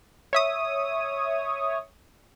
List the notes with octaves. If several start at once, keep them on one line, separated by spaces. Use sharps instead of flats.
C#5 E5 D#6